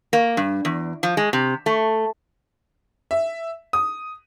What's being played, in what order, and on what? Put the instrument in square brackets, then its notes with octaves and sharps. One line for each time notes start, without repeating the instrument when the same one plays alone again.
[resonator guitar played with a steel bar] A#3
G2
E2
F3
G#3
C3
A3
[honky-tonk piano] E5
D#6